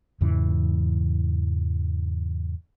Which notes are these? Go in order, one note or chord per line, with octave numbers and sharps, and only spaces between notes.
E2 G#2 C#3 E3